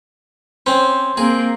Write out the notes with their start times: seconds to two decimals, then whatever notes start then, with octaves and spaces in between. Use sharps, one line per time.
0.66 C4 C#4 C5
1.17 A#3 C4 G#4